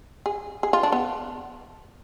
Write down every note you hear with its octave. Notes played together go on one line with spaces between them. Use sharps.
G#4
G#4
F4
D4
B3